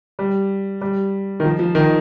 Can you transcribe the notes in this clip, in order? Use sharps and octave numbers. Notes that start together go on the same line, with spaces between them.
G3
G3
D#3
F3
F3
D#3